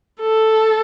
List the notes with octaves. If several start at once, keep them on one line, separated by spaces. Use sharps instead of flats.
A4